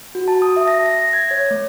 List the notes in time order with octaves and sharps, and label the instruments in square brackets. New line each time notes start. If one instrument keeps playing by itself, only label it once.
[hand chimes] F#4
A5
D#6
E5
A#6
A#6
A#6
G#6
C#5
A3